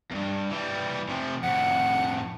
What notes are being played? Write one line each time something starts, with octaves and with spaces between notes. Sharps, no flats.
E2 G2
E3 G3
C3 F3
F2 A2 F#5